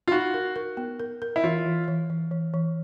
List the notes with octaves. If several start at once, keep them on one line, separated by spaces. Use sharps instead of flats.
F4
D#4 F#4
A#4
A#4
B3
A#4
A#4
E4
E3 F4
E3
E3
E3
E3
E3